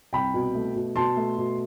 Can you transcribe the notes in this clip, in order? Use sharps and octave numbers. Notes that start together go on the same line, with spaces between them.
C2 G5 B5
B2
A3
B2
B2 A5 C6
A3
B2